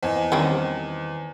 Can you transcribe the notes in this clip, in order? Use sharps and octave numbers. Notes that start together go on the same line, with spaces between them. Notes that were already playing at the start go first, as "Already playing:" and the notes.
E2 C5 D#5 G#5 A5
D#3 G3 C4 C#4